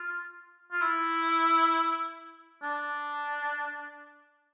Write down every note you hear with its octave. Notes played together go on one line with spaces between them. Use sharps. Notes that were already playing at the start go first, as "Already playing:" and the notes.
Already playing: F4
F4
E4
D4